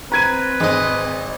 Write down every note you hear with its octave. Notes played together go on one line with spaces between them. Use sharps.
C4 B4 A#5 G#6 D#7
G#1 G#3 D#5